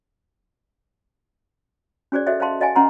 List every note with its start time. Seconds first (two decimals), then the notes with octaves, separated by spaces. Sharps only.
2.12 C#4 F#4 G#4 C5 D5
2.26 F#4 A4 C5 D#5 E5 G5
2.40 C5 D#5 F5 G5 A5 C6
2.60 F#4 D#5 F5 G5 G#5
2.76 C#4 B4 F#5 A#5 C6